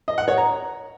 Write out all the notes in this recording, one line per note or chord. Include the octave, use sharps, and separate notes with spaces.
D#5
F#5
C#5
A#5